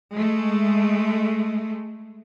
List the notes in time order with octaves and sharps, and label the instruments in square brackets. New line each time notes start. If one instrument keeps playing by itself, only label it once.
[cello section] G#3 A3